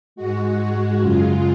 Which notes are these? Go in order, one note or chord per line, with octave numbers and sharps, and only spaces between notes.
G#2 G#3 F#4
F#4
F#2 C#3 G#3 F4